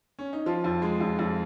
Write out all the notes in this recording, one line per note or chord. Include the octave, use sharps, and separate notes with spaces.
C#4
D#4
F3 F4
F2
G#3
F2
F2